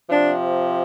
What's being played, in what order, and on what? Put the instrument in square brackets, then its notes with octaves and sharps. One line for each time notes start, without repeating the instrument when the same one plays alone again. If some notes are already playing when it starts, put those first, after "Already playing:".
[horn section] C3 F3 D4